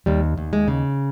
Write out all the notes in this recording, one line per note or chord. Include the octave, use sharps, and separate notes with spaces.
D#2 G3
D#2
G#3
C#3